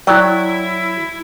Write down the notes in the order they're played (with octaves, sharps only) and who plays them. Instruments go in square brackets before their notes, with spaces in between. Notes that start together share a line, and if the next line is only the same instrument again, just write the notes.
[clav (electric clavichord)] F#3 [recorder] E4 [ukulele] D5 G5